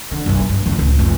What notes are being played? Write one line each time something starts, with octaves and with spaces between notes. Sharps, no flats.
D3
F#1 B1
G2
E2 C#3
C#2 A2
F1 C#2